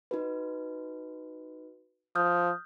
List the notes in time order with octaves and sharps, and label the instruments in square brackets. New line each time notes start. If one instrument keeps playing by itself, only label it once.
[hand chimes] D#4 F#4 B4
[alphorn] F3 [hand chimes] D#6 F6 G6